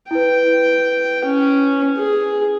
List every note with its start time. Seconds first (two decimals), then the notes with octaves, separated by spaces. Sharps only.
0.11 E4 B4 G5
1.25 C#4
1.97 G#4